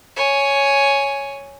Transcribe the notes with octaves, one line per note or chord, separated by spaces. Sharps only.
C#5 G#5